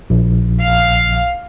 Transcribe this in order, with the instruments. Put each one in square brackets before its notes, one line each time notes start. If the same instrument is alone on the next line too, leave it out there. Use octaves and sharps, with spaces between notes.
[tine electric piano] A#1
[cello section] F5